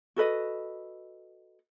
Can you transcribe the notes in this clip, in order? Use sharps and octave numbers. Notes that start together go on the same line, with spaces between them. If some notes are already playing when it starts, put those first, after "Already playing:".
F#4 A4 B4 D#5